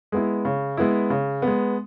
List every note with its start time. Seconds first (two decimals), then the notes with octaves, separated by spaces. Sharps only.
0.12 G#3 B3 E4
0.45 C#3
0.77 G#3 B3 E4
1.10 C#3
1.42 G#3 B3